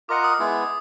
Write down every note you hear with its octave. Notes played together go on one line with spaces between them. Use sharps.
F4 A#4 D#5 F#5 D6
D#6
G#3 B3 E4